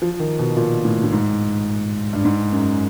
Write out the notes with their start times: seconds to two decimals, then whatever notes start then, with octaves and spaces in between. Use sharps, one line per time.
0.02 F3
0.20 D#3
0.39 B2
0.57 A#2
0.85 A2
1.04 A2
1.12 G#2
2.13 G2
2.25 G#2
2.52 F#2